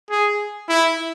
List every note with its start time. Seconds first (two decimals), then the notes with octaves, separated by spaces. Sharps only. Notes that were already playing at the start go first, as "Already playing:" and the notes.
0.10 G#4
0.69 E4